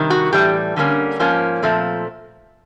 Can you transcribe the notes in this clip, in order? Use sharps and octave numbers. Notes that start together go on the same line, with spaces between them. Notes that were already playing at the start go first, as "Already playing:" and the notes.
Already playing: C3 D#3 G3
F#4
A2 E3 G3 G4
D3 G3 A#3 C#4
G#2 F3 A#3 C#4
A#2 F3 A3 C4